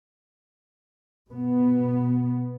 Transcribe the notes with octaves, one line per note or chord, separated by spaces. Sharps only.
B2 B3